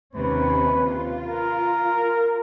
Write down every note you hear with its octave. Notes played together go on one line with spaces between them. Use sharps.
D#2 C3 C#4 B4
F4
A#4